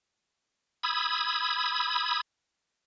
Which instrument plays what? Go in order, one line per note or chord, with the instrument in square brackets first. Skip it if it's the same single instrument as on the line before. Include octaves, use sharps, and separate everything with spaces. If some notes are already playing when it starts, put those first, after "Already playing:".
[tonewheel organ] B5 D#6 E6 G#6